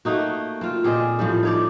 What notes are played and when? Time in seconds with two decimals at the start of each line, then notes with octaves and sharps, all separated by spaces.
0.05 A3 A#3 D#4 F#4
0.61 C4 F4
0.84 A#2 C4 G#4 D#5
1.19 A2 F3 G3
1.43 D#4 C#5 D5